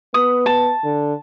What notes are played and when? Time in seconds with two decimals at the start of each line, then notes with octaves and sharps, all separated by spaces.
0.14 B3 D#6
0.46 A5
0.84 D3